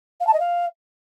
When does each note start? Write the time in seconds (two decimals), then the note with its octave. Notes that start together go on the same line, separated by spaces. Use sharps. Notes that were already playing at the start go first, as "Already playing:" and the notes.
0.20 F5
0.27 A5
0.33 D#5
0.39 F5